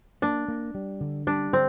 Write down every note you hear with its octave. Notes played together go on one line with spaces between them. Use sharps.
A#3 D4
A#3
G3
D3
G3 D4
D3 C4